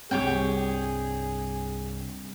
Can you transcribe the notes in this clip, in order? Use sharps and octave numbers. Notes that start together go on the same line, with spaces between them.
C2 G2 G3 C4 G4 G#4 C#5 G5